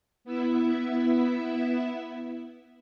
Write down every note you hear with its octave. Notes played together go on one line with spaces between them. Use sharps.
B3 E4 E5